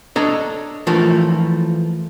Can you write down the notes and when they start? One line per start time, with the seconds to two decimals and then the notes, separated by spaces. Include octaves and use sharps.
0.16 D4 A4 C#5 D#5 A#5
0.87 E3 F3 A3 F4 A#4